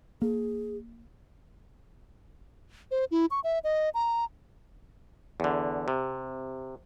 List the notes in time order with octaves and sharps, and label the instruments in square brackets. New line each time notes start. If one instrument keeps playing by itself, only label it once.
[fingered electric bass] A#3 [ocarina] G#4
[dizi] C5
E4
C#6
E5
D#5
A#5
[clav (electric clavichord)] E2 D3
C3